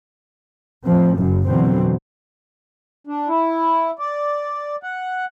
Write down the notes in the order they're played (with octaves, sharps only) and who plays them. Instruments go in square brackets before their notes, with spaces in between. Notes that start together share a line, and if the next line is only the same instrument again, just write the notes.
[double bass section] A2 F3 C4
F#1 F#2 C#3
F2 B2 D3 E3 F#3 C4
[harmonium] D4
E4
D5
F#5